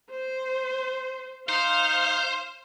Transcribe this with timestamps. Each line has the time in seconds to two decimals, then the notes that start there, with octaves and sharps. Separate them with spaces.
0.11 C5
1.49 D#4 C5 F5